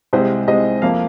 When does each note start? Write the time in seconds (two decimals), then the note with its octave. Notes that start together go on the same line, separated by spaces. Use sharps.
0.13 C2 C3 G#3 C4 C5
0.48 C2 C3 G#3 C4 D#5
0.82 F2 F3 A#3 F5